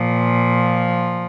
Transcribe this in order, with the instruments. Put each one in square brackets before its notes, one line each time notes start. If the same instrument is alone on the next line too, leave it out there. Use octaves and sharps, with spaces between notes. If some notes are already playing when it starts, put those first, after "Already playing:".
Already playing: [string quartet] A#2 F3